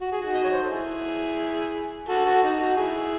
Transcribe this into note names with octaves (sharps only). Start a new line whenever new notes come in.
F#4
G#4
D#4 F#4
D#5
C#5
C5
A4
E4 G#4
F#4 A4
F#4 A4
D#4
D#4 F#4
E4 G#4